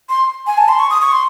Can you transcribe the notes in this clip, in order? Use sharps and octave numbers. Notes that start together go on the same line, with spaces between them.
C6
G#5
A5
C6
C#6
D#6
C#6
C6